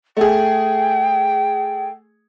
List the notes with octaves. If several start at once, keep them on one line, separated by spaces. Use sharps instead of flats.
A3 G#4 G5